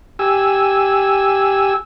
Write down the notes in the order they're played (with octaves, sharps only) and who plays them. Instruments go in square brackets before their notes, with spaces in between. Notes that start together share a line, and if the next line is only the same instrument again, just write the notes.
[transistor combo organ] G4 G#5 E6